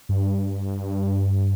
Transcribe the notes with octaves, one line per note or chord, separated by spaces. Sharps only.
G2